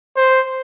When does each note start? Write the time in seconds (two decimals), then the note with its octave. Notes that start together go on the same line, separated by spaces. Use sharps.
0.17 C5